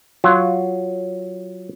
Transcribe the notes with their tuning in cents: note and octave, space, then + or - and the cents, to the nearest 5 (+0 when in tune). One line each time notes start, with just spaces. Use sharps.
F#3 +0 F4 +0